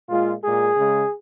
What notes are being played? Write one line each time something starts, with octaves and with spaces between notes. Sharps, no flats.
A#2 G#3 F4
A#2 G#3 G#4
C#3 G#3